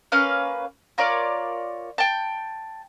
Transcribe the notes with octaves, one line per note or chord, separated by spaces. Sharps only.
A#3 C#4 B4 F5
F4 A#4 C#5 D5
G5 A5